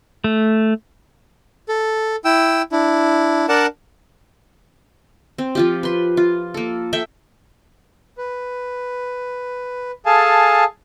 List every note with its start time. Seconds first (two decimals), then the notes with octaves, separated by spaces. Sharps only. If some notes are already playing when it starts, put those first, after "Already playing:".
0.24 A3
1.69 A4
2.25 E4 G5 E6
2.72 D4 E4
3.49 D4 A#4 D5 F#5 A5
5.38 C4
5.55 F3 F4 G4
5.83 B4 C6
6.17 F4
6.54 A#3 A4
6.93 A4 E5 G5
8.18 B4
10.06 G#4 A4 F5 G#5 A5